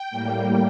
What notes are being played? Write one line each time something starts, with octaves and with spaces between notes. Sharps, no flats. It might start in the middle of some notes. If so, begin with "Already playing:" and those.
Already playing: G5
A2 G3 A#3